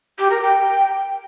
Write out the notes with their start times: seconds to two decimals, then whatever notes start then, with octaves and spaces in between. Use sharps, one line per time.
0.18 G4
0.30 A#4
0.41 G5